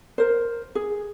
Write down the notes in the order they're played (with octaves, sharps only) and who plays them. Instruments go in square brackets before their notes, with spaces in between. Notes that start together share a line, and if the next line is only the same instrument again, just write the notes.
[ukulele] A#4 C5
G#4